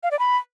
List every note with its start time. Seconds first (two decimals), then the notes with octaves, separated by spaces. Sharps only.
0.03 F5
0.11 D5
0.19 B5